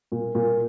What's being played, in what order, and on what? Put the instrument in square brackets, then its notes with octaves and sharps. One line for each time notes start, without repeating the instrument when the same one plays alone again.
[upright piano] A#2
A#2